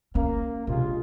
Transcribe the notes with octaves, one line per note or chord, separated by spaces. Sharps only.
A#3 C#4
A#1 C3 G#3 F4